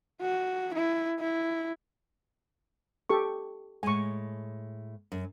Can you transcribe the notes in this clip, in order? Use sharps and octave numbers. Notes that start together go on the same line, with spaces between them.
F#4
E4
E4
G4 A4 C#6
A2 G#3 G#5 C#6
F#2